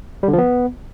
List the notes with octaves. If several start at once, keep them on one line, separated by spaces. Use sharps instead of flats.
G3
D3
F3
B3